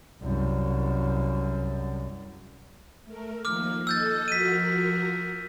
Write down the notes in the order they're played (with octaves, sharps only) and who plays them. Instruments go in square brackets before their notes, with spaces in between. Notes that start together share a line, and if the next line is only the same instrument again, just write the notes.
[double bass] C2 F#2
[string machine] A3 A#4
[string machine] D#3 F3 A#3 [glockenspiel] D6 F6
[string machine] A4 D#5 [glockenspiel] E6 G6 A6
[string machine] F3 F#4 A#4 [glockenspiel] B6 D#7